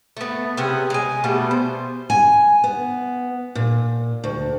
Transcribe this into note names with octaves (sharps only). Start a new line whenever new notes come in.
A3 B3
C3 B3 C#4 G#4
G#3 G#5
B2 G3 A3 B3
C5
G#5
B3
A#2
D2